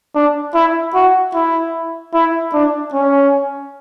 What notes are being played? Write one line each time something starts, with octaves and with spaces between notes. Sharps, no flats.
D4
E4
F#4
E4
E4
D4
C#4